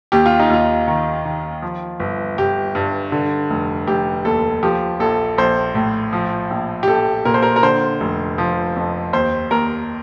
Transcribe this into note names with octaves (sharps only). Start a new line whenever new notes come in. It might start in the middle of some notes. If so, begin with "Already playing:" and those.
D#2 G4
F4
D#4
D#2 F4
D#3
D#3
F3
G1
G1 G4
G2
D3
F1
F1 G4
D#2 A4
F3 G4
A#1 A4
A#1 C5
A2
F3
A#1
G4
A#1 A4
A#2 A#4
C5
A#4
A#4
D3 C5
F1
F3
F2
D#2 C5
D#2 A#4